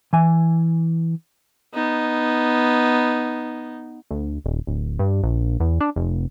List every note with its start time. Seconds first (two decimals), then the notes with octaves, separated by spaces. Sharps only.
0.13 E3 G#5
1.74 B3 D#4
4.11 D2
4.44 D#1
4.67 D1
4.99 G2
5.23 A#1
5.60 E2
5.80 D4
5.96 F1